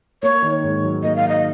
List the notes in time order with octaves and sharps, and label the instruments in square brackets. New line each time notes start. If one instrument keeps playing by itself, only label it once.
[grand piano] A#3 [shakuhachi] C#5
[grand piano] D#3
G#2
F#3
[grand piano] A#3 [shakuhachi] D#5
[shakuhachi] F5
[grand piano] D#3 [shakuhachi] D#5